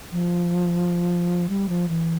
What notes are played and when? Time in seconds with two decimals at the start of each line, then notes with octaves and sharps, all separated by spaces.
0.12 F3
1.49 G3
1.69 F3
1.89 E3